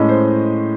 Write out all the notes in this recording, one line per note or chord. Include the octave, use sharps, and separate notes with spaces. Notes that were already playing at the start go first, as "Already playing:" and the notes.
Already playing: A2 G#3 C#4 D#5
C5